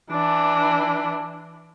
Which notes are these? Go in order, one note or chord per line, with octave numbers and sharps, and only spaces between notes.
E3 D4